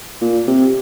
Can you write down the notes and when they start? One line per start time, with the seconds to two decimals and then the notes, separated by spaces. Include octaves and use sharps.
0.21 A#2
0.47 C3